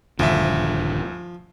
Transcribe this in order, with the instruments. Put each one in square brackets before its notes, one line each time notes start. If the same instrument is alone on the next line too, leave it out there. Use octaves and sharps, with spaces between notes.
[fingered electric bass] D#1 G2 D3 [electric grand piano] D2 E5 [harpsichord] F3